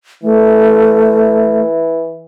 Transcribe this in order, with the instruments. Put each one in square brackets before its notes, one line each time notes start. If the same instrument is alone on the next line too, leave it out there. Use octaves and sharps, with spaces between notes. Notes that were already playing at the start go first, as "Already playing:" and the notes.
[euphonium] E3 [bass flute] A3